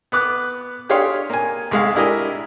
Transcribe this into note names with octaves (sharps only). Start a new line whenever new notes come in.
B3 B4 D6 F#6
D4 G4 G#4 C#5 F5 C6
A#3 G#5
C2 G#3 F5
D4 E4 G4 A#4 D#5 G#5